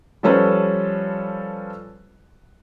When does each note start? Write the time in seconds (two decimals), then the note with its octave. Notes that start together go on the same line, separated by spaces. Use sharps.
0.23 F3 G3 C#4 A4 B4 C5